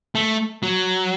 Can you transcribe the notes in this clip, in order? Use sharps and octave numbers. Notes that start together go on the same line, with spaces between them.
A3
F#3